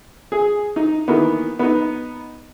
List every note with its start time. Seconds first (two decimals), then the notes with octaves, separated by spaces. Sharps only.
0.32 G#4
0.76 D#4
1.08 D#3 E3 A#3 B3
1.59 B3 D#4